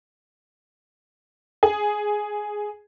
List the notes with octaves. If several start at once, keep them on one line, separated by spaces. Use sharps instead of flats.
G#4